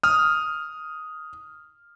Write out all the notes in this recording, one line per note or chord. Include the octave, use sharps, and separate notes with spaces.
D#6 F6